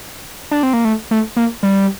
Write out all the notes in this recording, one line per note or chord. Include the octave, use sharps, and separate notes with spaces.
D4
C4
A#3
A3
A3
A#3
G3